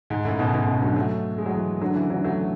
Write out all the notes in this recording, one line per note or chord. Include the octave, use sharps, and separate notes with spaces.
G#2
F#2 A2
G#2 B2
G#2 B2
A2 C#3
D3 F#3
F#3 A3
G#3
F#3
E3 G#3
D3 F#3
C#3 E3
D3 F#3
F#3 A3
A3